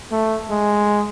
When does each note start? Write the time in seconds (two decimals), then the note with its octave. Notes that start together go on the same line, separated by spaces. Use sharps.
0.11 A3
0.50 G#3